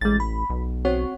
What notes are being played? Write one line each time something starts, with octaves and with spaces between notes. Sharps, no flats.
A1 G#3 A6
B5
B1
C4 F#4 C#5